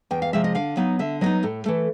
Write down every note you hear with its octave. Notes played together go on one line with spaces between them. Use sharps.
E2 G5
F5
C3 F3 G#3 E5
D#5
D3 F5
F#3 B3 D#4
D3 E5
F#3 B3 D#4 D#5
A2 A4
E3 A3 A4